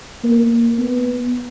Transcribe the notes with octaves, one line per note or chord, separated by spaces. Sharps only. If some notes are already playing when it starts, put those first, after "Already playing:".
A#3
B3